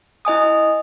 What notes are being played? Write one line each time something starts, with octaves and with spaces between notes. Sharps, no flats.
E4 D#5 G#5 D#6